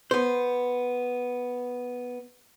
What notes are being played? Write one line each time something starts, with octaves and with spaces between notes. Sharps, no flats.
B3 C5